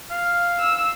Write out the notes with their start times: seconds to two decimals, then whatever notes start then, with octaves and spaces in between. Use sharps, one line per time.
0.11 F5
0.59 E6